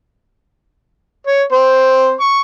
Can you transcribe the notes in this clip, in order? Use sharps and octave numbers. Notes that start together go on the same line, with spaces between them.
C#5
C4 C5
C#6